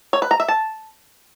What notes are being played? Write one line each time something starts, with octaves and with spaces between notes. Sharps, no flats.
C#5
B4
A#5
E5
A5